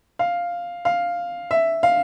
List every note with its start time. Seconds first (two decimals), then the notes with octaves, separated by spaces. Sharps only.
0.19 F5
0.85 F5
1.51 E5
1.83 F5